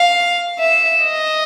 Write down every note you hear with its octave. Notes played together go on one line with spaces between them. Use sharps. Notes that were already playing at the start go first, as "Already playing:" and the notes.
Already playing: F5
E5
D#5